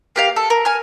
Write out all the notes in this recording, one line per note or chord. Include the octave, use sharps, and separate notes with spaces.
A#3 G4 F5
A4
A#4
G#5 F6